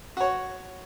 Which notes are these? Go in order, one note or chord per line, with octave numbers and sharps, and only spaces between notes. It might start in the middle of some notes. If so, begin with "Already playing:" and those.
F#4 C#5